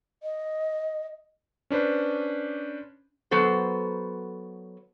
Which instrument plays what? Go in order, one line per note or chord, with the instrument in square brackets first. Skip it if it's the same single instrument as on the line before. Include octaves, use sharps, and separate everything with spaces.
[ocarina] D#5
[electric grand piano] C#4 D4 B4 C5
[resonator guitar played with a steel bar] F#3 B3 A4 C5